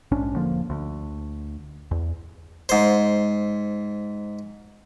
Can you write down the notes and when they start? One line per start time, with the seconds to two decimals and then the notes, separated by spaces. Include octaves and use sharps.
0.12 A#1 G#2 C#4 D4
0.36 E1 D3 F3 A#3
0.70 D2
1.91 E2
2.69 G#2 C5